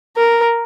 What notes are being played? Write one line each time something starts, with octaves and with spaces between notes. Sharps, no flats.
A#4